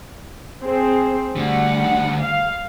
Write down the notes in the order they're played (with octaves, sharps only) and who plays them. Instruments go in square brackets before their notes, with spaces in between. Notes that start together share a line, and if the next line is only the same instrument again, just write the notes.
[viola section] C4 G#4 C5
[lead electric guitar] D2 D3 [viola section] G3 F#5
[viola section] F5